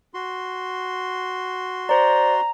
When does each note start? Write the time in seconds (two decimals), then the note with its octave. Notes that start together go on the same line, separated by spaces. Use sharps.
0.14 F#4 C6
1.89 C5 D5 A#5